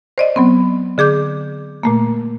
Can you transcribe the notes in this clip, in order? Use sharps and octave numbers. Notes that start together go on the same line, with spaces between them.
C5 D5 D#5
F#3 B3 C4
D3 G#4 D6 G6
A#2 A3 A#3